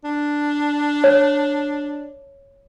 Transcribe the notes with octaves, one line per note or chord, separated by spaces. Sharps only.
D4
C#5